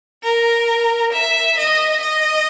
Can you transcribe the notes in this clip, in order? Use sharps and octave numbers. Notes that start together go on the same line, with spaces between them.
A#4
E5
D#5
D#5